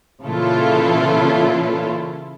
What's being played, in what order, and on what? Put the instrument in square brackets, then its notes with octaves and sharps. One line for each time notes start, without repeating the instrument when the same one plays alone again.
[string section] A#2 C#3 E3 E4 F4 A4